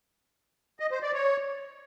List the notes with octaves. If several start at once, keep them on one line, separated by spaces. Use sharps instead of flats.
D#5
C5
D5
C#5